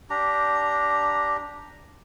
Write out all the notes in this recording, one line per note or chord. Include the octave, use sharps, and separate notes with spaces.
D4 G4 A#5